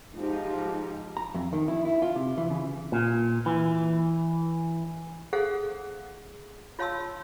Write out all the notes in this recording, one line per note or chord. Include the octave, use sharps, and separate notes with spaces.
G#2 F3 D#4 G4
A#5
F2
D#3
E4
E4
F4
C3
E3
C#3
A#2
E3
G#4 A4 C5 F5 F#5
F4 C#5 F5 A5 C6 E6